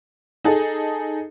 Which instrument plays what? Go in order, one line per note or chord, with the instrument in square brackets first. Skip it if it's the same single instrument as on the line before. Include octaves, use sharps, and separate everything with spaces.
[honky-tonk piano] D#4 G#4 A4